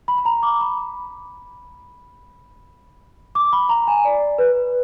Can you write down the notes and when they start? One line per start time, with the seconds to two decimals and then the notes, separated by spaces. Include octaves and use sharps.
0.08 B5
0.18 B5
0.25 A#5
0.43 D6
0.61 B5
3.35 D6
3.53 B5
3.69 A#5
3.88 G#5
4.05 D5
4.39 B4